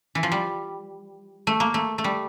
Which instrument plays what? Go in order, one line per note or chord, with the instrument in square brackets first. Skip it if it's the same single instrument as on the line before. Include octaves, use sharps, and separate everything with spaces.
[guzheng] E3
F3
G3
A3
A#3
A3
A3
G3